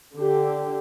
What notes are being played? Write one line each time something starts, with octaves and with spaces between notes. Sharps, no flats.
D3 G4